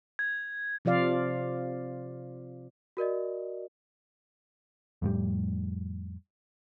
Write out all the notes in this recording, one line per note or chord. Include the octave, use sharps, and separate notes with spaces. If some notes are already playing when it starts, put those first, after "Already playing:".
G#6
C3 F3 F4 D5 F5
F#4 A#4 D5 D#5
F2 A2 G3